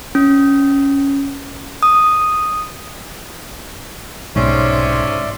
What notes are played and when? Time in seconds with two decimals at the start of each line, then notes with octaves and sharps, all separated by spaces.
0.15 C#4
1.83 D#6
4.36 B1 G#2 C3 C#4 D5 E5 C6